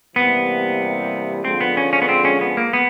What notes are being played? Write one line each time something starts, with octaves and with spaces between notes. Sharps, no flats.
C3 E3 G3 A#3 B3
D3 F3 G#3 C4
B3
C#4
C#4
B3
C4
C#4
B3
A#3
B3